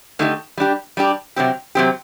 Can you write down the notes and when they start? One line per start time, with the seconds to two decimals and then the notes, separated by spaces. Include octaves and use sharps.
0.19 D3 A3 D#4 G4
0.58 G3 D4 G4
0.97 G3 D4 G4
1.36 C3 F#3 C4 G4
1.75 C3 F#3 C4 G4